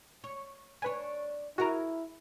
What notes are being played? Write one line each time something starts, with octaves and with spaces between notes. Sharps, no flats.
C#5
D4 B4 C#5 G#5
E4 F#4 G#4 A#4 A#5